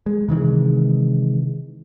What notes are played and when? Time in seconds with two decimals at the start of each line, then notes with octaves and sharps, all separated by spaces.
0.06 G#3
0.28 C3 D#3 E3 G#3